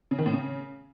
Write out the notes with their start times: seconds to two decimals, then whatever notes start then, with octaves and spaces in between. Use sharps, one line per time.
0.11 C#3
0.19 D#3
0.26 A2
0.33 C#3